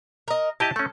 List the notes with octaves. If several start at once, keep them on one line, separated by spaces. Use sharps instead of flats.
A#4 D#5
E4 G4 D#5 A5
A3 C#4 A4